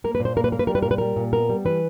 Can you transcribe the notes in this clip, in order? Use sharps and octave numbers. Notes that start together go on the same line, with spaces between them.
A#3 A#4
B4
A#2
C5
A#3 A#4
B4
A#3 A#4
B4
G3 A#4
B4
A#2 A#4
B4
G3 A#4
A#2
B3 A#4
G3
E3 B4